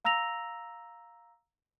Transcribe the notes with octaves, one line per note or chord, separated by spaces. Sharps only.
F5 A#5 E6 A#6 F7